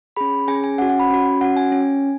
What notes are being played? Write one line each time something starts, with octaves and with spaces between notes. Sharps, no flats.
C#4 G#4 B5
C#4 G#4 G#5
G#5
C#4 F#4 F#5
F#5
B5
C#4 F#4
C#4 F#4 F#5
G#5
C#4